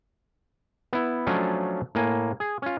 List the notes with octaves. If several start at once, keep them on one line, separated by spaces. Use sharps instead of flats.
B3 E4
F3 F#3 A3 C#4 D4 F4
A2 A#3 G#5
G#4
C#4 F4